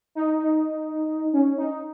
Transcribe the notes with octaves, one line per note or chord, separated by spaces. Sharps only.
D#4
D#4
C#4
D#4